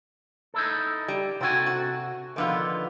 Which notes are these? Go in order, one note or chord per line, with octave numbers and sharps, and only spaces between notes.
D#4 E4 A4
G3
C3 C4 F#4 A4 G#5
F#4
D3 D#3 F3 B3 F4